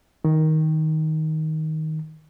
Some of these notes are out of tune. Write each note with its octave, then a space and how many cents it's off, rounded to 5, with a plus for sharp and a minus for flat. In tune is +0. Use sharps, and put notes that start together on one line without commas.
D#3 +10